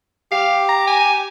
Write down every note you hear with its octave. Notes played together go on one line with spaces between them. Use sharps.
G4 F5
A#5
G#5